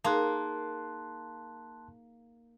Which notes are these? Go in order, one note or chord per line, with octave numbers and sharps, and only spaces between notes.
A#3 D#4 G#4 A5 C6 F#6